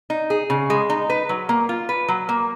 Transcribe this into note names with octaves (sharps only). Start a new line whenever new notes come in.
D#4
G#4
C#3
G#3
D#4
B4
F#3
A#3
F4
B4
F#3
A#3